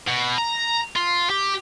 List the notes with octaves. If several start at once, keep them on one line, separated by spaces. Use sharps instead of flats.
B2
A#5
F4
G4